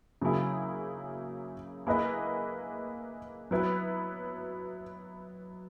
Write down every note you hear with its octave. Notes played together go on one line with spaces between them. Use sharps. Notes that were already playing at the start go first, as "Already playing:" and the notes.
C#3 F#3 A#3 E4 G#4
A#3 E4 G#4 B4 D#5
F#3 B3 E4 B4